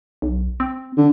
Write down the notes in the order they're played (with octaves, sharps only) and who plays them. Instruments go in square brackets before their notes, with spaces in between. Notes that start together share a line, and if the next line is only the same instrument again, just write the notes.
[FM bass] B1
C4
[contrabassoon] D3